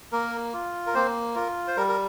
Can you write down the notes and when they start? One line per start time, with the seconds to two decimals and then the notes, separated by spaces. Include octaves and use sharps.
0.12 A#3 A#4
0.53 F4
0.87 A#4
0.94 A#3 C4 C5
1.35 F4 A#4
1.68 C5
1.77 G3 A#4
1.89 A#4